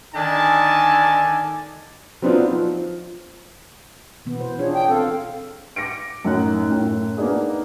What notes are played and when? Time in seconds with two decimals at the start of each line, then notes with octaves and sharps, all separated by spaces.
0.14 D3 D#3 D#4 D5 G#5 A5
2.22 F#3 B3 C4 D4 D#4 F4
2.51 F3
4.26 B2 E3 B3
4.41 C5
4.59 D4 F4 G#4 C#5
4.73 G5
4.89 C4 A4 F5
5.76 D6 A#6 C#7 D7
6.25 F#2 A2 F#3 D#4 F#6
6.69 F#2 A2
7.17 A#3 B3 D4 D#4 G#4